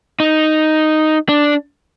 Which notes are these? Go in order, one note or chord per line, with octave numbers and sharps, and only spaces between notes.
D#4
D4